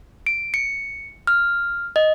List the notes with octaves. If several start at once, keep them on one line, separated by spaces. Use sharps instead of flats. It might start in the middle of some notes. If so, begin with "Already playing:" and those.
D7
C#7
F6
D#5